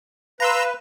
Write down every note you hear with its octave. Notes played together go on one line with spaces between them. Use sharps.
B4 F5 A#5 C6 E6